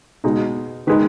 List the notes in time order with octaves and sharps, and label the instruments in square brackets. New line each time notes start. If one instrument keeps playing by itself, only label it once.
[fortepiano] B2 G#3 D#4
D#3 G#3 D#4 B4